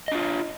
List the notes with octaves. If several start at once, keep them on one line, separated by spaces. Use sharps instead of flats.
D4 F4 D#5